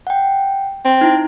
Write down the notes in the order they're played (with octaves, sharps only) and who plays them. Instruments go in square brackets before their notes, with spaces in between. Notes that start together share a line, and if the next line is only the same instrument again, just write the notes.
[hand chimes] F#5 G5
[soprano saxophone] C4
[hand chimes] D#4 E4